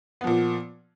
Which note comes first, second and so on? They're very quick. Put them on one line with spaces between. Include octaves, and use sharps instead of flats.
B3 F3 A#2